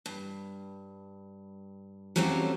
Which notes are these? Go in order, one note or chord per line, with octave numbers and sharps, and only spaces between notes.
G2
F#3 G3 A3 C4 C#4 F4